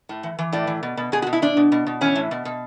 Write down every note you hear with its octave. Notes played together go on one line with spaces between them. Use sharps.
A2
E3
E3
A2 D5
E3
B2
B2
B2 G#4
F#4
B2
E4
B2 D4
B2
B2
B2
E3 C#4
A2
B2
B2